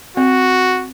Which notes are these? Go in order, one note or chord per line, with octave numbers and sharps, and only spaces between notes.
C4 F#4